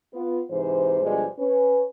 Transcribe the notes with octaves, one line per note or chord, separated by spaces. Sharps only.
B3 F4
G#2 C3 E3 C5
D2 G2 B2 F3 G#3
C#4 B4